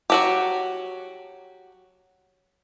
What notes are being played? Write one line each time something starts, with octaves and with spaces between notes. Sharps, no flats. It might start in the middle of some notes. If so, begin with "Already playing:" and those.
F#3 F#4 G4